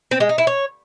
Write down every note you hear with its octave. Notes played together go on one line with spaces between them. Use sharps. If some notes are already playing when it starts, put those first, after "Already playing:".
C4
G#3
D#4
E4
C#5